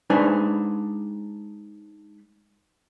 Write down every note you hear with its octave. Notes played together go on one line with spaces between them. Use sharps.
G#3 D4 D#4 B4 C5 G#5